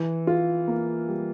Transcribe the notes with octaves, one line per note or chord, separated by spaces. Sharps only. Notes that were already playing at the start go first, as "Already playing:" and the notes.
Already playing: E3
F4
A#3
G3